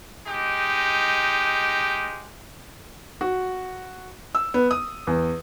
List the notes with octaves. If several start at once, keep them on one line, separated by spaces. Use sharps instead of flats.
G#3 D#4 G4
F#4
E6
B3
D#6
E2